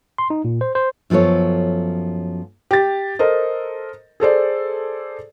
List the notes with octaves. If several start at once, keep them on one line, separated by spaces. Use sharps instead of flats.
C6
D#4
A#2
C5
C5
F#2 F3 B3 A4 C#5
G4 A6
A4 A#4 C5 D#5
G#4 A4 C5 D5